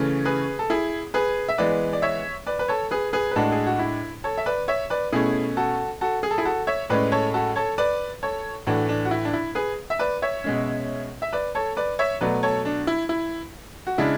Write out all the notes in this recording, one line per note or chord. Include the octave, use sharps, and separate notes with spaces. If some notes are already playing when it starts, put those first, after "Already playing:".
Already playing: C#3 E3 A3 C#4
G#4 B4
A4
E4 G#4
G#4 B4
E5
E3 G#3 B3 B4 D5
D5
C#5 E5
B4 D5
B4
A4 C#5
G#4 B4
G#4 B4
B4
A2 G#3 D4 F#4 A4
G#4
F#4
E4
A4 C#5
E5
B4 D5
C#5 E5
B4 D5
B2 A3 C#4 E4 G#4
F#4 A4
F#4 A4
G#4
A4
E4 G#4
F#4 A4
C#5 E5
A2 G#3 C#4 B4 D5
A4 C#5
F#4 A4
A4 C#5
B4 D5
A4 C#5
A2 E3 A3 D4 F#4
D4
F#4
E4
D4
E4
G#4 B4
E5
B4 D5
C#5 E5
B2 G#3 C#4
E5
B4 D5
A4 C#5
B4 D5
C#5 E5
B2 F#3 A3 B4 D5
A4 C#5
D4
E4
E4
F#4
C#3 G#3 D4 E4